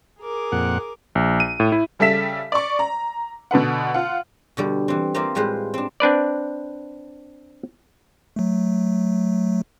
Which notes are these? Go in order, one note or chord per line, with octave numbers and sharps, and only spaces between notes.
G#4 A#4 D6
F2 A#2 F#5
A#1
D#7
A2
E4
C#3 G3 A4 E5 B6 E7
D5 C#6
A#5
B2 D3 B4 F#5
F4 F#5
B2 D3 G3
E3 C4
A#3 C4 F4 G4 D5 E5
A2 G3 G#3 F4 B4 C5
C4 D4
C4 D4 B4 D5
F#3 A3